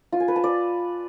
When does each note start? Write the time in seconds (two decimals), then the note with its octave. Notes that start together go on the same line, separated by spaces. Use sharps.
0.12 F4
0.20 G#5
0.28 B4
0.36 A5
0.44 D5